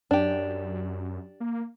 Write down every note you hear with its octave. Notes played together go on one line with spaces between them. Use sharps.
F#2 D4 G4
A#3